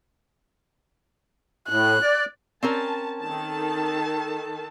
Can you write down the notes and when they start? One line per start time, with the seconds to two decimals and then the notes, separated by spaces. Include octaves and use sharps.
1.69 A2 F#6
2.02 D5
2.63 C4 C#4 A#4 A5
3.21 D#3 A4 A5